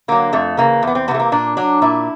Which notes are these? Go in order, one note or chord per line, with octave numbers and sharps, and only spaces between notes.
D3 F#3 A#3
F2 A3
C#3 E3 A#3
E2 B3
C4
C3 E3 A3 B3
A#3
A#2 D4
F#3 D4
A#2 E4